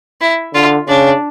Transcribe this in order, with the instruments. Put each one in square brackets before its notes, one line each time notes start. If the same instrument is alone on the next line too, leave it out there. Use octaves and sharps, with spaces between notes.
[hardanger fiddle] E4
[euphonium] D3 [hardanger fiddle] F4
[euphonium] C#3 [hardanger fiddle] D4